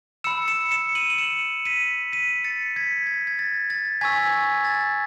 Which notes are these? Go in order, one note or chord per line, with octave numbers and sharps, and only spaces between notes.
B5 E6 C#7 E7
C#7 E7
C#7 E7
D#7 F#7
F#7
C#7 E7
B6 D#7
B6 D#7
A6 C#7
G#6 B6
G#6
G#6
A6
A6
G#5 C#6 E6 G#6 B6
G#6
A6